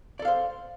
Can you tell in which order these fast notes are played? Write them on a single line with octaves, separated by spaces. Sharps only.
D5 A4 F5 C5